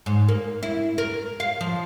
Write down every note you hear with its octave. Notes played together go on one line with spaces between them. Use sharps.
G#2
A#3
E4
A#4
F5
F3